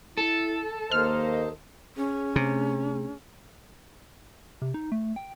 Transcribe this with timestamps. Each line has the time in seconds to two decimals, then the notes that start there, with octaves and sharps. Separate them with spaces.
0.18 E4 A4
0.91 D#2 A#3 C5 D#5 F6
1.97 C#4 G#4 C#5
2.36 C3 A3 D4 G#4
4.62 C3
4.74 D#4
4.92 A3
5.16 G5